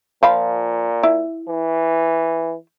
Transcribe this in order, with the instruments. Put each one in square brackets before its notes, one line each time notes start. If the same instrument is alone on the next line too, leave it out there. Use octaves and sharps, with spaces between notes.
[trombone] A#2 [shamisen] F3 F5 B5
[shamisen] E4
[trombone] E3